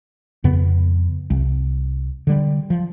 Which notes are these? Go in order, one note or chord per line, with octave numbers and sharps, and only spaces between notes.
F2 C#3 B3
C2
D3 G3
F3